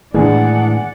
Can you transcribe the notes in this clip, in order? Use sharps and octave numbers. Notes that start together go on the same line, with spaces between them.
A2 D#3 E3 G#3 D4 G#4 D5 F#5